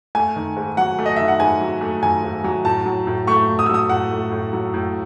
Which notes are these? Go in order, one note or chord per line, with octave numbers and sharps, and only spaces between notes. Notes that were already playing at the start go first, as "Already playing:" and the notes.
A3 G#5
D#3
G#2
F#3 F#5
A3
D#5
D#3 E5
F#5
G#2 G#5
F#3
A3
D#3 G#5
G#2
F#3
A2 A5
F#3
A2
A3 C#6
A2
D#6
E6
F#3 D#6
A2 F#5
A3
A2
F#3
A2